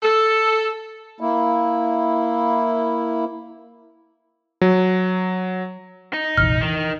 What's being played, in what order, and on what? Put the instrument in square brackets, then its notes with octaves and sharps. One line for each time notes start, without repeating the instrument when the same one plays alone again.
[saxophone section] A4
[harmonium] A#3 E4
[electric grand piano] F#3
[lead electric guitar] D#4
[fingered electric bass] F1 A#1 E3 [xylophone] F6
[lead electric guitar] D#3 [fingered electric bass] E3